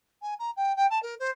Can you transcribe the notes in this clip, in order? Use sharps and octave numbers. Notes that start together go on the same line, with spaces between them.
G#5
A#5
G5
G5
A5
A#4
C5